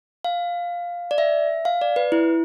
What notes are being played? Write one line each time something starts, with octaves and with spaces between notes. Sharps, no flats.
F5
D5
E5
F5
D5
B4
E4